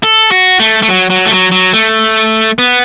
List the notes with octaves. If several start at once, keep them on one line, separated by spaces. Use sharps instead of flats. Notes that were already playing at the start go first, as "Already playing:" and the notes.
A4
F#4
A3
A3
F#3
F#3
A3
F#3
F#3
A3
B3